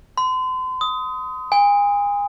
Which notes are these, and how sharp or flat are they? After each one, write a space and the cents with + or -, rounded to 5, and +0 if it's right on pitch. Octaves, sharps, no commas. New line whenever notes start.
C6 -40
D#6 +20
G#5 -35